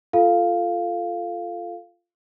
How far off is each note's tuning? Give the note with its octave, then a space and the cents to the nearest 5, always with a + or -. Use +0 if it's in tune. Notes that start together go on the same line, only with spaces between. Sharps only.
F4 -5 A4 +0 F5 +0